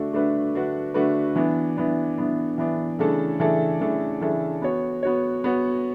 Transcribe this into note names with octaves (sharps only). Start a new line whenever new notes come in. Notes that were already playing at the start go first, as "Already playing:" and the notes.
Already playing: D3 A3 D4 F#4
D3 A3 D4 F#4 B4
D3 A3 D4 F#4 B4
D3 A3 D4 F#4 B4
E3 B3 D4
E3 B3 D4
E3 B3 D4
E3 B3 D4
C#3 E3 A3 D4 A4
C#3 E3 A3 D4 A4
C#3 E3 A3 D4 A4
C#3 E3 A3 D4 A4
B3 F#4 C#5
B3 F#4 C#5
B3 F#4 C#5